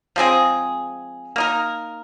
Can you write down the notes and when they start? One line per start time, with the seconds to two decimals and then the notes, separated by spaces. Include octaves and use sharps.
0.16 F3 G#3 C4 G#4
1.36 A#3 D#4 A#4